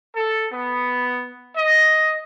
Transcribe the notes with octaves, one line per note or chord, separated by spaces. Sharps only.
A4
B3
D#5